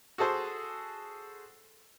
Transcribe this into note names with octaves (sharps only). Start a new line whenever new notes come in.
F#4 G#4 A4 C5